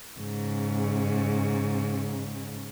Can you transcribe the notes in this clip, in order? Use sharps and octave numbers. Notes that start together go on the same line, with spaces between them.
G#2 C#3